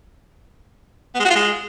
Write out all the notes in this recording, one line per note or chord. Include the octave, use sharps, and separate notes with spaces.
B3
G#3
F#4
F4
G#3